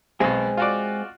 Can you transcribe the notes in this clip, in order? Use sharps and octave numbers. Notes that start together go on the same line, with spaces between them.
B1 B2 G#3 C4 G#4
F4 F#4 D5